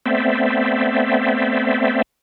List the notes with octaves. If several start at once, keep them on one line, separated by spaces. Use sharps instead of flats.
A3 B3 C4 C5 D5 E5